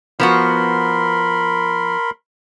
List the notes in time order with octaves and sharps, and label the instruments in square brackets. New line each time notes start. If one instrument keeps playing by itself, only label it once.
[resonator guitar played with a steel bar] F3 B3 F#4 [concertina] A#4 B5 C6